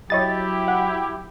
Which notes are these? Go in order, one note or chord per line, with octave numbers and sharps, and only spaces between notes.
F#3 E4 G4 C#5 D#5 A6
F#5